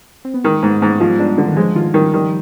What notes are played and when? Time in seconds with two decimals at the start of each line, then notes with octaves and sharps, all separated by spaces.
0.25 C4
0.34 B3
0.44 D#3 G#3
0.63 G#2 B3
0.81 G#2 B3
1.00 F3 G#3
1.10 G3
1.19 G#3 D4
1.38 D3
1.48 D#3
1.57 F3 G#3
1.75 D#3 F4
1.94 D#3 G3
2.13 D#3 G3